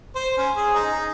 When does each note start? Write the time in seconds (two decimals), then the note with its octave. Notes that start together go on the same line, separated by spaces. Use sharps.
0.15 C5
0.37 C#4
0.56 G#4
0.74 D#4